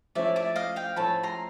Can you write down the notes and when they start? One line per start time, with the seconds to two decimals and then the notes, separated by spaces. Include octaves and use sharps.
0.15 F3 A3 C#4 E4 D5 E5
0.36 D5 E5
0.56 D#5 F5
0.76 F5 G5
0.96 F3 A3 C#4 E4 A5 B5
1.23 A#5 C6